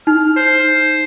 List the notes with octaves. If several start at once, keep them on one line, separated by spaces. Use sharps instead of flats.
D#4 F6
C5